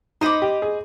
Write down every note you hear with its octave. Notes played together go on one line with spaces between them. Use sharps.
D#4 C5 D#5 B5 D6
G4
G#4